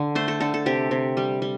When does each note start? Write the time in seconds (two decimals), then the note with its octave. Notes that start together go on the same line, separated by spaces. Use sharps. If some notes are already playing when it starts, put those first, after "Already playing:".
Already playing: D3
0.15 A3 C5
0.28 A4
0.40 D3 A4
0.54 A4
0.66 C3 G4
0.91 C3
1.17 G3
1.42 G3